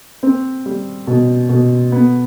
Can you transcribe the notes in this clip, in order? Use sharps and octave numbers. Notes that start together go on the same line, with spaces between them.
C4
G3
B2
B2
B3